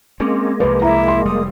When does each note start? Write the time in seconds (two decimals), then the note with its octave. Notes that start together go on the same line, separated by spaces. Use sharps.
0.20 G#3 A#3 C4 C#4
0.60 C2 F3 B4
0.82 E4 A#5
1.08 C6
1.25 F1 G3 D#6